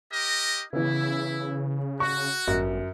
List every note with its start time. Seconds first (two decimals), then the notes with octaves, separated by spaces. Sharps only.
0.12 G4 A#4 D#5
0.73 C#3 E3 B3 E4
2.00 F#4 C#6
2.48 G1 F#2